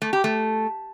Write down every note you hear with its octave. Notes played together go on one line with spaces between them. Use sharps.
A3
G4
A3